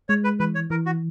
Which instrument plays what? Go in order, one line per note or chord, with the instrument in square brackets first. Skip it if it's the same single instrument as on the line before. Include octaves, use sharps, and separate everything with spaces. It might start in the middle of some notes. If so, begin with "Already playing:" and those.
[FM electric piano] G#3 [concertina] C#5
[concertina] B4
[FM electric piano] E3 [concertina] B4
[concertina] C#5
[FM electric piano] E3 [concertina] A#4
[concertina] F#4